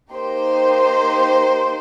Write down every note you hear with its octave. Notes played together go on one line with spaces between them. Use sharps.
A#3 D#4 G4 C5